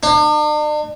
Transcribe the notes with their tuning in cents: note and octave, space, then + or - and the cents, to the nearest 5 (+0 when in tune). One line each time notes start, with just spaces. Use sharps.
D4 +45